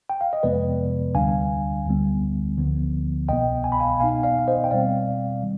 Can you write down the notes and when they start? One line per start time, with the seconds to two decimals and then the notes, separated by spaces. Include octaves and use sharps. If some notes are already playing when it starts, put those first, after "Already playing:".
0.10 G5
0.21 F5
0.33 D#5
0.43 F2 C3 F3 G#3 B3 B4 D5
1.15 D2 D3 G3 D4 F5 G#5
1.86 D2 D3 G3 B3
2.58 D2 D3 F3 B3
3.29 C2 B2 B3 D#5 G5
3.64 G#5
3.72 B5
3.80 F5 G#5
4.00 B2 B3 D#4 F5 G#5
4.23 D5 F5
4.39 F5
4.48 C5 D#5
4.64 G5
4.71 B2 G3 C4 D5 F5
5.42 D#3 G3